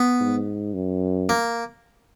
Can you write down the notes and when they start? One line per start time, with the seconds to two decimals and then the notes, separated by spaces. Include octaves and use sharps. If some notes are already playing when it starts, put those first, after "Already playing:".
Already playing: B3
0.20 G#2
0.74 F#2
1.29 A#3